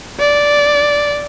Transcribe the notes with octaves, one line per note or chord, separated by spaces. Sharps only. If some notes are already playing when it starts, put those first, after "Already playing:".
D5